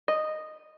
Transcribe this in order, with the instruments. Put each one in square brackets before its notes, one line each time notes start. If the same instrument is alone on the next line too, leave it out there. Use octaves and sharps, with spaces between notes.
[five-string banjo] D#5